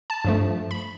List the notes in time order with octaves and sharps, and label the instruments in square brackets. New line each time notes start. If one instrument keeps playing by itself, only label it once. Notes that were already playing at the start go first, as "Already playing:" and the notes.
[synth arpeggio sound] A5
G2 F3 A3
B5